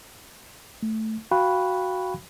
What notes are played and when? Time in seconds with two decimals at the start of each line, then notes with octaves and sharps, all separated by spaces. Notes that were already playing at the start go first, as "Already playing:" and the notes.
0.83 A3
1.31 F#4 F5 G5 B5 C#6 F#6